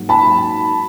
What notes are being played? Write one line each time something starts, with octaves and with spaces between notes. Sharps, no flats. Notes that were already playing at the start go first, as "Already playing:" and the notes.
Already playing: G#2 F#3 A#3
A5 B5